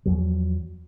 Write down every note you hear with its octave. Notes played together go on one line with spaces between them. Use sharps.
E2 F3 F#3